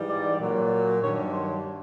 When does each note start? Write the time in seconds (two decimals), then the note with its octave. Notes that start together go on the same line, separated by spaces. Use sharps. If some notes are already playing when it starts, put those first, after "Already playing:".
Already playing: G#2 E3 G3
0.09 D5
0.40 A#2 F#3
1.01 G2 D#3 F#3 C#5
1.31 C5